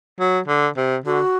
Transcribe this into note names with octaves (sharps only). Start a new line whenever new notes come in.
F#3
D3
C3
D3 F#4